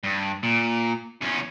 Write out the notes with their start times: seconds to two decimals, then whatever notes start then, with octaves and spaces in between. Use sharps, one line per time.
0.03 G2
0.43 A#2
1.21 E2 C#4